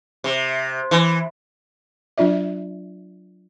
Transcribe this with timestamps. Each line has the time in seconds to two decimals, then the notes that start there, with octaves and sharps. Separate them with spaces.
0.24 C3
0.91 E3
2.18 F#3 D4 F4 D5 E5